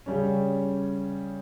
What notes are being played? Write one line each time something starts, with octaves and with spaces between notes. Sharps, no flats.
C#3 G3 C#4